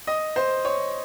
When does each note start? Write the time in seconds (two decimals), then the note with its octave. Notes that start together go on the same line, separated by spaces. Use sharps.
0.07 D#5
0.36 C5
0.65 C#5